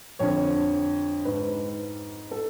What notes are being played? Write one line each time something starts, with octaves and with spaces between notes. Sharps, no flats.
F2 D3 C#5
G#2 B4
A4